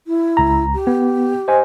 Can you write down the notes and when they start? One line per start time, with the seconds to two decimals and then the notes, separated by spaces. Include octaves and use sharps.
0.07 E4
0.37 C#2 A#5
0.74 G4
0.87 B3
1.48 C5 D#5 G#5